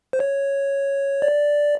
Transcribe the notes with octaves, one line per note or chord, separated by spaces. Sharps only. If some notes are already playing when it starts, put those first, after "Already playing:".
C5
C#5
D5